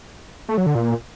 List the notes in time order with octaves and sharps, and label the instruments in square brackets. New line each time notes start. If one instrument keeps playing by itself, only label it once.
[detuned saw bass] A3
F#3
D3
A#2